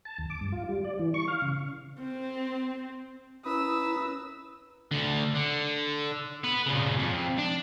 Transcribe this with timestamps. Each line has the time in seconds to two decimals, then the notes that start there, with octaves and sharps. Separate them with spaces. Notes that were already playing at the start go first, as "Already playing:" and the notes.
0.05 A5
0.18 D#2
0.30 D6
0.41 G2
0.52 F4
0.69 G3
0.84 D5
0.99 E3
1.14 C#6
1.28 F5
1.42 C#3
2.00 C4
3.46 D#2 C#4 E4 B4 A#5 D#6 E6
4.92 D2 D3
5.35 D3
6.44 B3 B4
6.66 A#2 C#3
6.99 F2
7.39 D4